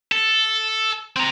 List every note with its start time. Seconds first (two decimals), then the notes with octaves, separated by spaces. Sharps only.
0.12 A4
1.17 C4 A#5